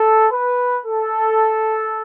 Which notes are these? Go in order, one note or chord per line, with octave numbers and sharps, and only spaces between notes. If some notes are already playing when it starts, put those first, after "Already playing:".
Already playing: A4
B4
A4